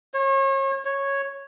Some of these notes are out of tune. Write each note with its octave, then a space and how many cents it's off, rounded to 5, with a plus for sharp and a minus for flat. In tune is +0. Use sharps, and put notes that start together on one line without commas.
C#5 -35
C#5 -5